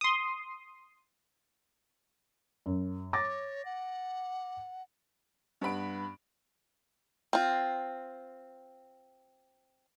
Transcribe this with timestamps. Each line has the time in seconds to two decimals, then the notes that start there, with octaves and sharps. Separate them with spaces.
0.01 C6 D#6
2.66 F#2
3.13 C#5 D6 A6 A#6
3.65 F#5
5.61 G2 B3 B5 D7
7.33 C4 F4